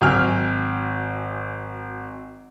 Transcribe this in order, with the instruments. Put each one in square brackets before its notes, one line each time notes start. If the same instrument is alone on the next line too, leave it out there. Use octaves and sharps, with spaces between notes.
[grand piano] G#1 F#3 G5 G#5 F6